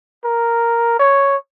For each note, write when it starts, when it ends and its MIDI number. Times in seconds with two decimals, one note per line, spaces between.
0.24 0.95 70
0.99 1.36 73